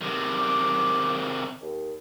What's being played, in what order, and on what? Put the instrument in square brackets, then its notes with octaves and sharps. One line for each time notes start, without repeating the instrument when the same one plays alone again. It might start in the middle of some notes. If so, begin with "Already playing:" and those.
[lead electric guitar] C3 D#3
[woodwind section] D6
D#2